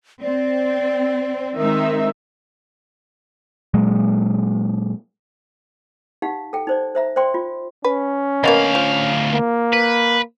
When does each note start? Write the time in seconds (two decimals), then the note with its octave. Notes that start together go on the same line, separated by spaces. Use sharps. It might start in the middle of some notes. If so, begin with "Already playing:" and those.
0.22 C4 D5
1.56 D#3 G#3 C4 D#4 E5
3.74 A#2 F#3 G#3
6.22 D#4 G4 F5 F#5
6.53 A4 G5
6.67 D#4 C5 D5
6.95 C5 E5 A#5
7.16 C5 D5 G5 C6
7.34 F4
7.84 C#4 B4
8.44 D2 A#3 B3 D#5 F5
8.75 F3
9.33 A#3
9.73 B4